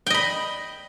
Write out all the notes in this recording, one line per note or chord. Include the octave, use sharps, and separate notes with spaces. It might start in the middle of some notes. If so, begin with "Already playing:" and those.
D#5 G5 B5